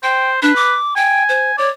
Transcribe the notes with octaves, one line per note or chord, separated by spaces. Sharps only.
C5 G5
D4 B4
D6
G5 G#5
C5
C#5 D5